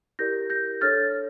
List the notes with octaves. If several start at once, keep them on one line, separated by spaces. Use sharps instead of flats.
E4 G4 A#4 D5 G6 A#6
G6 A#6
D4 A4 C#5 F6 A6